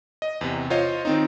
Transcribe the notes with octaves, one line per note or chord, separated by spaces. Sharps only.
D#5
E2 C3
F4 C5 C#5 D#5 F5
D#3 C4 D#4